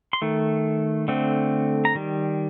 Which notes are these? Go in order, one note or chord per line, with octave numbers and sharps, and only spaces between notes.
C6
D#3 A3
D3 A3 C4
A#5
D#3 G3